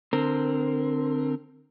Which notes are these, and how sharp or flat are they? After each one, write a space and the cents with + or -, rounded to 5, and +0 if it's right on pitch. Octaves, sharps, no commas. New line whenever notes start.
D3 +20 C4 +0 A#4 +0